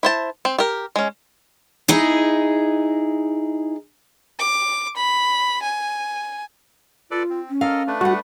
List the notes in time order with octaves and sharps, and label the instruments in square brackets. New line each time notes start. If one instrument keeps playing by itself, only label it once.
[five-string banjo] E4 C5 A5
C4
G4 A#4
G#3 C#4
[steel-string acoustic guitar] D#4 E4 G#4 D#5
[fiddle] D6
B5
G#5
[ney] F4 [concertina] A4 B4 D5
[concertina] C4
[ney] C#4
[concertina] A4 A#4 D#5 [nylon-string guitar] F5
[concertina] A3 D4 B4
[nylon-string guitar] G3 F#5 [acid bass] F#4 [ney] B5